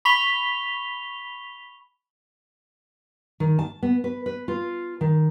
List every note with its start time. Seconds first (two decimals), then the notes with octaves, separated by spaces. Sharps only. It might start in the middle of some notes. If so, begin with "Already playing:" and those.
0.05 B5 C#6 B6 F7 G7
3.40 D#3
3.59 A5
3.83 B3
4.04 B4
4.26 B4
4.48 F4
5.01 D#3